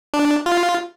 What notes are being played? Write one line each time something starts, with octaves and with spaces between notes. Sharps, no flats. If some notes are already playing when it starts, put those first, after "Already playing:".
D4
F4